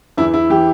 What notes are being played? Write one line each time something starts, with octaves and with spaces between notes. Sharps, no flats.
E2 E3 E4
E4
E3 G4